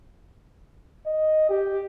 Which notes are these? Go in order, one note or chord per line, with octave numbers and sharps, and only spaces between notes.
D#5
G4